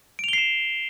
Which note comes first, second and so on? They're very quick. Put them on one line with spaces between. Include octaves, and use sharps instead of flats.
D7 F7 G7 C7 E7